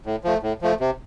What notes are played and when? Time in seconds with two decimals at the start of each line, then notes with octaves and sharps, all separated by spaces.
0.06 A2
0.24 F3 A3
0.43 A2
0.62 F3 A3
0.80 C3